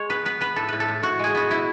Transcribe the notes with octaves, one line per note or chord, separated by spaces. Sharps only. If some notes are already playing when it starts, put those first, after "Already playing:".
Already playing: G#3 C#5
B3 B4
B3 B4
B3 B4
A2 A4
A2 B4
A4
A2
A2 F#4
G#3 G#4
B3 F#4
B2 E4